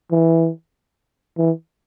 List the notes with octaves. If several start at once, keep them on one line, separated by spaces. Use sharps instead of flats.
E3
E3